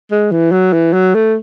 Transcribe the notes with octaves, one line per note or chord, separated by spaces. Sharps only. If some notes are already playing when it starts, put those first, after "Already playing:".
G#3
E3
F#3
E3
F#3
A3